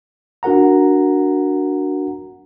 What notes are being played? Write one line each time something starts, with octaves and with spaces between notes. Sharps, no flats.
D4 F#4 A#4 F#5 A#5